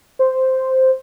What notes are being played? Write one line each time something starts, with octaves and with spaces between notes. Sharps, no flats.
C5